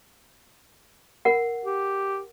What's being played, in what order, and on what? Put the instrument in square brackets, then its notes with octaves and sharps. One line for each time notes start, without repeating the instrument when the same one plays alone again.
[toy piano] A#4 F#5
[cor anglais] G4